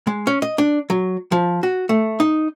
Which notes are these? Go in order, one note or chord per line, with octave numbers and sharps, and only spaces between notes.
G#3
C#4
D#5
D4
F#3
F3
F#4
A3
D#4